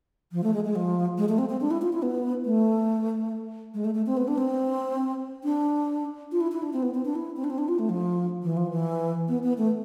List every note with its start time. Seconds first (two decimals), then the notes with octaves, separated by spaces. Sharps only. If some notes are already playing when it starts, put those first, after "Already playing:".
0.32 F3
0.43 A3
0.54 G#3
0.65 G#3
0.75 F3
1.18 G#3
1.29 A3
1.38 C4
1.49 C4
1.61 D4
1.71 E4
1.82 F4
1.93 E4
2.02 B3
2.45 A3
3.74 G#3
3.84 A3
3.94 A3
4.06 C4
4.17 B3
4.28 D4
4.38 C4
5.44 D4
6.32 F4
6.41 E4
6.52 E4
6.62 D4
6.73 C4
6.83 B3
6.95 C4
7.05 D4
7.15 E4
7.36 C4
7.44 D4
7.50 C4
7.58 D4
7.68 F4
7.79 A3
7.89 F3
8.43 E3
8.57 F3
8.71 E3
9.29 B3
9.44 B3
9.58 A3